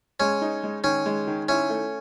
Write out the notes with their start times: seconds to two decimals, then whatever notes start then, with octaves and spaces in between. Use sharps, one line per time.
0.20 G#3 C#4
0.42 D#4
0.63 G#3
0.84 D#3 C#4
1.06 G#3
1.27 D#3
1.49 C#4 E4
1.70 A3